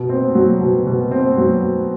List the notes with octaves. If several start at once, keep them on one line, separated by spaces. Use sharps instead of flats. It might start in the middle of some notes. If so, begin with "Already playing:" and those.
Already playing: B2
C4
F#3
B2
B2
C4
F#3